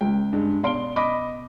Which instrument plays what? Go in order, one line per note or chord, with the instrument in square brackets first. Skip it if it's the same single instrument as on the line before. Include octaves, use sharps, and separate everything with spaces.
[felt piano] C#2 [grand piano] G5
[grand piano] G2 G#3
[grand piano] B2 D7 G7 [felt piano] D5 F5 C6
[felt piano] D#5 B5 D6